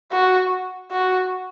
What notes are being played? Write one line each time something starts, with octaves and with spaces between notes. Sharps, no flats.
F#4
F#4